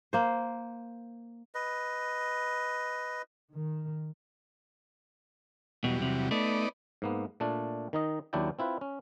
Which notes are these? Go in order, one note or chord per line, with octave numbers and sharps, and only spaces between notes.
A#3 C5
B4 D#5
D#3
E2 B2 F#3 G3
C3
A3 B3 D#4 D5
G#2 A#3 B3
A#2 A3 D4
D#3 D#4 D#5
D#2 F#3 D4 E4 D5 G5
C4 E4 F4 B4
C#4